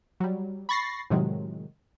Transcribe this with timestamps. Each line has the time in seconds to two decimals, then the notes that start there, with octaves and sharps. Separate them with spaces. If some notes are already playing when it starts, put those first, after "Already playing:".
0.20 F#3 G3
0.69 B5 C#6 A6 A#6 C7
1.10 A2 C3 D#3 F#3 G#3